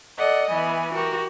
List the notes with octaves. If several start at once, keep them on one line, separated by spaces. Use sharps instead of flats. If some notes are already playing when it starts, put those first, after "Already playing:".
A4 D5 D#5 F#5
E3 B3 G#5
F#4 G4 A#4